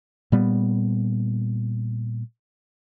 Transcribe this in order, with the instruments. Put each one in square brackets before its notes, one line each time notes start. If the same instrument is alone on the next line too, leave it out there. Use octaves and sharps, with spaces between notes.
[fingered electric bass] A#2 G3 B3